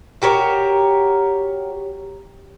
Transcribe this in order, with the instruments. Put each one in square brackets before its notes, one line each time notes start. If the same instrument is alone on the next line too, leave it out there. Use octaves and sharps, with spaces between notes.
[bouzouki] F#4 G4 A#4 C#5